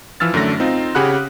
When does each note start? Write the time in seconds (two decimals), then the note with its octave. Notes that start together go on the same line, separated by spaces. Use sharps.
0.20 E3 F3 E6 F6 A6
0.34 F#2 D3 A3 A#6
0.60 C4 D#4 F4
0.95 C#3 G4 G#4 F#5 B5 F#6